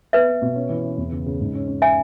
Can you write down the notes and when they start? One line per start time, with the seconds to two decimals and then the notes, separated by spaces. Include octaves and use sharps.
0.13 B3 B4 E5
0.28 B3
0.42 B2
0.56 C#4
0.69 E3
0.84 C#4
0.98 E2
1.12 C#3
1.26 C#3
1.40 G#2
1.55 C#4
1.68 C#4
1.82 E5 G#5